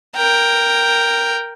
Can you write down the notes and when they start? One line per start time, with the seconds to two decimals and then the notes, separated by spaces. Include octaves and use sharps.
0.16 A#4 G5